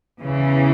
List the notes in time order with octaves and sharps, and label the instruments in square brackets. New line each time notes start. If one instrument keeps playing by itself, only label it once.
[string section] E2 C#3 E3